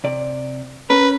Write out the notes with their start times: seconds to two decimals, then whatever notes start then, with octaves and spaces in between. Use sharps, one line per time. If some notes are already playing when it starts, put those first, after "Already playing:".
0.04 C3 D5
0.90 C#4 A#4 B4